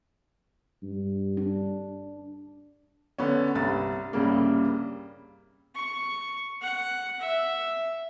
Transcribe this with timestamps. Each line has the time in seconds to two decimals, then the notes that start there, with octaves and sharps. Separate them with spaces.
0.83 G2
1.37 D4
3.18 D3 B3 C#4
3.55 C2 G2 A6
4.13 C2 G2 C#3 G3 A#3
5.75 C#6
6.62 F#5
7.21 E5